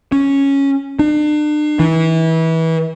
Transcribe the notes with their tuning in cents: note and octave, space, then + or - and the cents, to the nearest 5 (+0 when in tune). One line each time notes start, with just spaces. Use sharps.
C#4 -5
D4 +40
E3 -25